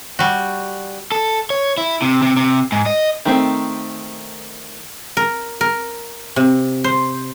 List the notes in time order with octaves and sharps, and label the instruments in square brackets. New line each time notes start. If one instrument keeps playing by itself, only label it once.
[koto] G3 F#4
[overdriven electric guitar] A4
C#5
E4
C3
C3
C3
G#2
D#5
[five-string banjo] D#3 A3 C4
[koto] A#4
A#4
C3
C5